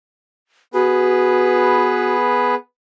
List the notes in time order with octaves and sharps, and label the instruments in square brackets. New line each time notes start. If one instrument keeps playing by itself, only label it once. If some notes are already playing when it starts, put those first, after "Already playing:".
[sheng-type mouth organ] B3 G#4 B4 [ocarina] F#4